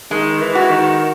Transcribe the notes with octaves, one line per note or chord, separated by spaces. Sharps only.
D#3 G#3
E3
F#4
D#3